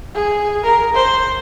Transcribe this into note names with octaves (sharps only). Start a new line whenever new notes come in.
G#4
A#4
C5